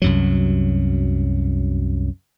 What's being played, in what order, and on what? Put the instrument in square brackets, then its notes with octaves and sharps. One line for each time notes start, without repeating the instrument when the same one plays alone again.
[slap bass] C2 F#2 F#3